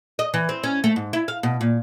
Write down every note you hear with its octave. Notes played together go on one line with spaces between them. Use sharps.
D#5
E3
C4
C#4
A3
G#2
E4
F5
B2
A#2